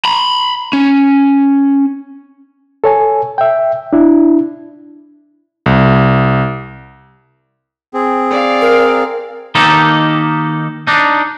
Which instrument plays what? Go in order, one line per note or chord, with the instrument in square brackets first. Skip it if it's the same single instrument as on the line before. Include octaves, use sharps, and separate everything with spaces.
[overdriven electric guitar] A#5 B5
C#4
[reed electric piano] A4 C#5 G#5
E5 G5
D4 E4
[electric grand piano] C2
[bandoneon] C4 G#4
[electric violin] D5 F5
[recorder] A#4
[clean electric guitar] D#3 A#3 D#4 G4 A4
D4 D#4